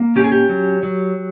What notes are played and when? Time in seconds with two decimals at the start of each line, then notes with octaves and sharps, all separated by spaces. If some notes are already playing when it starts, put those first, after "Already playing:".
Already playing: A#3
0.16 C#4 G4
0.24 G#4
0.32 G4
0.49 F#3
0.83 F#3